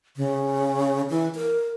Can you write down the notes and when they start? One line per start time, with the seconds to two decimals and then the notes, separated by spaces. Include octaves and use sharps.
0.17 C#3
1.10 E3
1.35 A#4